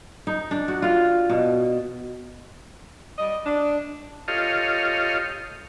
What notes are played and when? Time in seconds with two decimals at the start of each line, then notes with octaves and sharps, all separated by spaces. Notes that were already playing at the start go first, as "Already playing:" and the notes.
0.27 D#4
0.51 D4
0.68 F#4
0.82 F4
1.29 B2
3.18 G3 D#5
3.45 D4
4.28 F4 G4 A4 C#5 D#5 F5